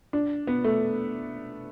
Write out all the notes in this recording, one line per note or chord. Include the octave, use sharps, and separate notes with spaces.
D4
B3
A3